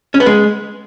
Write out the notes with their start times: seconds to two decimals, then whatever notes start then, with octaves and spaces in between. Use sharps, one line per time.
0.14 C#4
0.20 B3
0.26 G#3